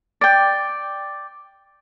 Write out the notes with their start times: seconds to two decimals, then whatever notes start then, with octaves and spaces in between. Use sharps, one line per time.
0.21 D5 G5